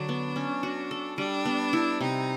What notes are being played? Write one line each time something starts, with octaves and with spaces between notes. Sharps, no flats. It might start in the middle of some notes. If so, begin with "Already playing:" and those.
Already playing: D3 F#3 D4
B3
C#4
F#4
A4
G3 D4
B3
E4
C3 D#4